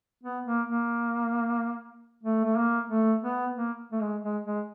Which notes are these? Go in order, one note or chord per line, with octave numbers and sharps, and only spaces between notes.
B3
A#3
A#3
A3
A3
A#3
A3
B3
A#3
A3
G#3
G#3
G#3